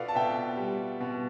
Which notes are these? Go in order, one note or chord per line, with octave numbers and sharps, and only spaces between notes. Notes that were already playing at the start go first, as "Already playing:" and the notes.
Already playing: B2 B3 F4 A4 D5 F5
A5
B2 E5 G5
G3
B2